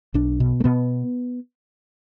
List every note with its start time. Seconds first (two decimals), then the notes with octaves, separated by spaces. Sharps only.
0.14 B1 D4
0.40 B2
0.60 A3
0.64 B2 B3